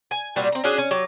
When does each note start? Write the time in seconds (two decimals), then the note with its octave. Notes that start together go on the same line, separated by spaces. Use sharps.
0.11 G#5
0.36 A#2 G3 C4 F#4
0.52 C4 A#5
0.64 C#4 D4 F#4 G#4
0.78 C#4
0.91 F#3 G4